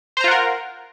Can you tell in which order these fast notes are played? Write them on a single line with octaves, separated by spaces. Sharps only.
C5 A#5 F4 F#5 A#4